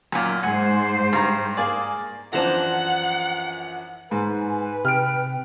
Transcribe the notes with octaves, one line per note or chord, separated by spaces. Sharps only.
F#2 A#2
G#2 C5 F#5 G#5
G2 A#5
A#3 G#4 D5
F#2 E3 F3 D4 C5 F#5 A#5
G#2 B4 G#5
C3 G5 F6 D7